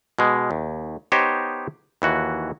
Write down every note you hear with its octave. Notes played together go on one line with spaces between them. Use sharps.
B2 G#3
D#2
B3 D#4 G4 C5 C#5 D#5
D#2 E3 F#4